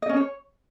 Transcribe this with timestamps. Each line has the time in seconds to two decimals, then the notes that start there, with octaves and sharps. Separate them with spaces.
0.02 D#5
0.09 C#4
0.16 C#5